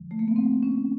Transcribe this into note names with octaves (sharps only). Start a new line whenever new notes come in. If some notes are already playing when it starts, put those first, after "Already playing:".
Already playing: F2 D3 F3 G#3
A3
A#3
B3
C4
C#4